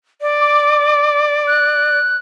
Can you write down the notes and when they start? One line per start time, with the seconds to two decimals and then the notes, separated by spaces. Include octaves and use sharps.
0.21 D5
0.41 D6
1.48 F#6